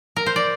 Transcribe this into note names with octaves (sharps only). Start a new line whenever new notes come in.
A#4
C5
D5